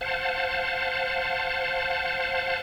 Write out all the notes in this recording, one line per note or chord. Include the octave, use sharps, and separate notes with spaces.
C5 F5 F#5 A5